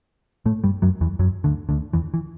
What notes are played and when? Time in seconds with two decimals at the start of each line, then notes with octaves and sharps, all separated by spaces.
0.46 A2 A3
0.64 G2 G3
0.82 F#2 F#3
1.01 E2 E3
1.19 F#2 F#3
1.44 D2 D3
1.69 D2 D3
1.93 E2 E3
2.14 E3